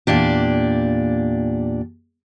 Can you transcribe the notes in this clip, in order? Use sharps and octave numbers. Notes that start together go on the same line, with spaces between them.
E2 G2 A#2 D4 G4